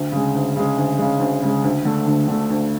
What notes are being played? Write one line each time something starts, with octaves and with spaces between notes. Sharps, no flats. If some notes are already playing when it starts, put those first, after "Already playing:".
Already playing: D2
C#3 G#3
D2
C#3 G#3
D2
C#3 G#3
D2
C#3 G#3
D2
D3 A3
D2
D3 A3
D2